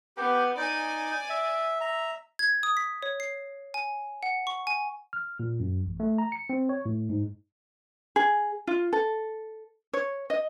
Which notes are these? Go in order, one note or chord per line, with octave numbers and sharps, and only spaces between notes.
B3 G4 G5
D#4 D5 G#5
E5
E5 A#5
G#6
D#6
B6
C#5
C7
G#5
F#5
C#6
G#5
F6
A#2
F#2
A1
A3
A#5
C#7
C4
C#5
A2
G#2
G#4
F4
A4
C#5
D#5